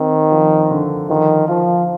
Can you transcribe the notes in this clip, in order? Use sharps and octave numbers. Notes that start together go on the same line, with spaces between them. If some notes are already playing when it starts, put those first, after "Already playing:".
Already playing: D#3 C4 D#4
F3
D3
D#3 F3
F3 F4